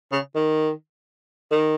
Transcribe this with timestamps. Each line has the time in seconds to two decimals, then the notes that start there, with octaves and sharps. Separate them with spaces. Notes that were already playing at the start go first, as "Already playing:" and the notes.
0.12 C#3
0.36 D#3
1.52 D#3